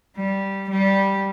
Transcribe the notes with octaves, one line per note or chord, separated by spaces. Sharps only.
G3
G3